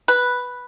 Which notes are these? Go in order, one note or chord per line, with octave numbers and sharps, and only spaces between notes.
B4